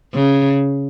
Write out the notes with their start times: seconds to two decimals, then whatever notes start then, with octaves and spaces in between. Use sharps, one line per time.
0.14 C#3